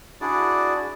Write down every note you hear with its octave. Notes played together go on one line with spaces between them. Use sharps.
D4 E4 F#4 G#4 D5